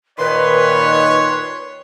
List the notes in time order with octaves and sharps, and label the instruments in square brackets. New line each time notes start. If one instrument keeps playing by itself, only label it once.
[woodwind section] A#2 D#3 [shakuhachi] B4 [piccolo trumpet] C#5 [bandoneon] C6